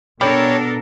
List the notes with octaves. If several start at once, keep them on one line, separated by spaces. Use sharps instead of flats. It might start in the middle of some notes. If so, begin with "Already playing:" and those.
B2 G3 B3 D4 A4 A#4 C#5